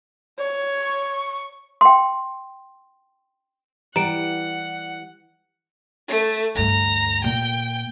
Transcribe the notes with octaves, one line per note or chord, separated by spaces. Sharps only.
C#5
C#6
G5 C6
E3 G3 F#5 A#5 D7
A3
D2 G2 A#5
A#2 G5